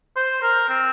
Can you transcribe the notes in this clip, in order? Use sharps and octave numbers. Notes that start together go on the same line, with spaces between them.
C5
A#4
C4